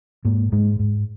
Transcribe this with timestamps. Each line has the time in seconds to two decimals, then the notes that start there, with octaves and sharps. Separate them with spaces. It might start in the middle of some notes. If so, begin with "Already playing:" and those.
0.25 G#2 A#3
0.52 G#2 G#3
0.79 G#2